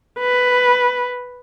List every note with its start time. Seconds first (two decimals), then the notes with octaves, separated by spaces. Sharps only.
0.19 B4